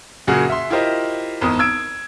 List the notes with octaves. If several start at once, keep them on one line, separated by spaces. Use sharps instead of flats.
F#2 A#2 C#3 F#4 G#4
E5 C6
E4 F4 G4 A#4 C5 D#5
G#1 E2 D#6
E6 G#6 D7